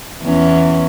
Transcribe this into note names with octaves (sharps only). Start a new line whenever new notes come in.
E2 C#4